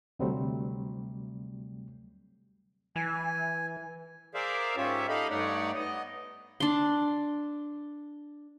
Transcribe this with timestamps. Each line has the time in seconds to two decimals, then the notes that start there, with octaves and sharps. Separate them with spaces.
0.19 D2 C3 F#3 G3 A3 C4
2.96 E3 G#5
4.34 G#4 A#4 C5 D5 E5 F5
4.77 G#2 C#4 F4 G4 C#5 E5
5.09 D#4 G4 A4 D#5 F5 B5
5.30 G2 A3 D#4 C#5 D5 F#5
5.74 B3 D#5
6.60 D4 C6